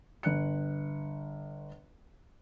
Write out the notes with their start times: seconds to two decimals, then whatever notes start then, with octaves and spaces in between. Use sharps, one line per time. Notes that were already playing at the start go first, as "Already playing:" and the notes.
0.23 G1 F#6 C#7